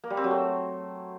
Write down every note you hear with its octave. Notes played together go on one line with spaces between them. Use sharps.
A#3
G3
C4
F#3
A3